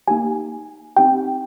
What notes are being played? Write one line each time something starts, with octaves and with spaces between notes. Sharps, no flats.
A#3 D#4 G4 G#5
C4 D#4 G4 G5